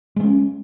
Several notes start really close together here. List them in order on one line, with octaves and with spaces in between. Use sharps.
G#3 B3 C#4